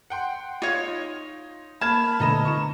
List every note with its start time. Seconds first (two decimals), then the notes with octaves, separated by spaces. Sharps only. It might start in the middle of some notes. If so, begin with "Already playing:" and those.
0.10 F#5 G5 C6
0.62 D#4 F4 C#5
1.81 A#3 A5 B5 F6 G#6 E7
2.20 D2 D3 B3 A4 D#5 A#5 E7
2.45 E4 C#6 E7